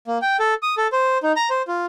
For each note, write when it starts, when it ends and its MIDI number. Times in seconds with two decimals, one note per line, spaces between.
0.07 0.18 58
0.22 0.37 79
0.40 0.54 69
0.63 0.75 87
0.77 0.87 69
0.92 1.18 72
1.23 1.32 63
1.36 1.49 82
1.50 1.62 72
1.68 1.86 65